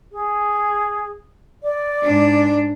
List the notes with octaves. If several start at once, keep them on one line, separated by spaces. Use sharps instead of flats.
G#4
D5
G#2 D4